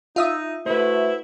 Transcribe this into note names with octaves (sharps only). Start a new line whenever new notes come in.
D#4 F4 E5 D#6
A3 E4 F#4 B4 C5